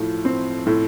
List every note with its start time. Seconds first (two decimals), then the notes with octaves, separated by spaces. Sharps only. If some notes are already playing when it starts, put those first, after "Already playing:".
Already playing: A2 F3
0.25 C4
0.67 A2